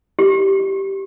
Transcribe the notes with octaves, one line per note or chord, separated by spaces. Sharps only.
G4